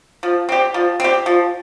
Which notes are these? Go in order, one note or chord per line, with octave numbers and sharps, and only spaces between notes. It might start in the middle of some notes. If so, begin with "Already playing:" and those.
F3
C4 G4
F3
C4 G4
F3